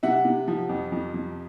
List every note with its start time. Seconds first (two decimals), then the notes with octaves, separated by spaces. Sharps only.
0.03 C3 E5 F#5
0.25 C3
0.48 F3
0.69 F2
0.92 F2
1.14 F2